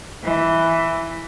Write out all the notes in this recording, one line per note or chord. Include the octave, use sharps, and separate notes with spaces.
E3